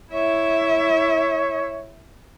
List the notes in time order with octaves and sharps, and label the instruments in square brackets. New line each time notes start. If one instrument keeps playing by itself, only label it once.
[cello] E4 E5 [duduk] C#5